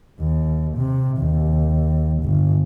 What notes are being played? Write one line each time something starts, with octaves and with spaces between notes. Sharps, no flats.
D#2
C3
D#2
G1